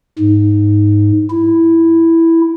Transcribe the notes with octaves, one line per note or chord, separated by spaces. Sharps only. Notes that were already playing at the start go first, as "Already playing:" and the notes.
G#2
E4